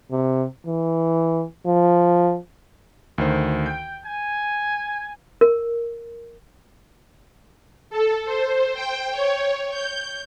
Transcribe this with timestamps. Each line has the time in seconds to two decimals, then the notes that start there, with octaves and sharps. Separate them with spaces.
0.12 C3
0.67 E3
1.66 F3
3.18 D2 D#3 C5
3.66 G5 G6
4.04 G#5
5.41 A#4
7.90 A4
8.25 C5
8.74 G5
9.12 C#5
9.71 G6